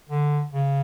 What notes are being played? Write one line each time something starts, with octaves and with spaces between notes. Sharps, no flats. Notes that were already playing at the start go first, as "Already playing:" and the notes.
D3
C#3